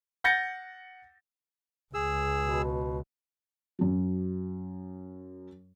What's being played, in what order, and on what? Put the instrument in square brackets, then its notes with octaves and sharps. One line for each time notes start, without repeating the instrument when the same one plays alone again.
[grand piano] F#5 G6 A6 A#6 C#7
[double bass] C#2 [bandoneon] G#4 E6
[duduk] B2
[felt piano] F#2 F#3